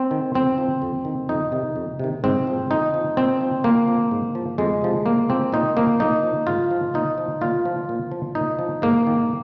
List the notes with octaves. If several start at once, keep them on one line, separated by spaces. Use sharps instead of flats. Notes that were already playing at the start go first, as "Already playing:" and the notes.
Already playing: C4
D#3
F2 C4
F3
F2
D#3
F2 D#4
C3 D#3
F2
C3 D#3
G#2 C4
F3
F2 D#4
F3
A#2 C4
F3
A#2 A#3
F3
G#2
F3
F2 G#3
C3 F3
A#2 A#3
F3 C4
A#2 D#4
F3 A#3
A#2 D#4
F3
G#2 F4
F3
A#2 D#4
F3
A#2 F4
F3
A#2
F3
A#2 D#4
F3
G#2 A#3
D#3